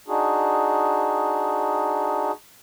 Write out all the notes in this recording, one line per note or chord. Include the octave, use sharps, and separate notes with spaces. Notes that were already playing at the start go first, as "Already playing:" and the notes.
D4 D#4 F#4 G#4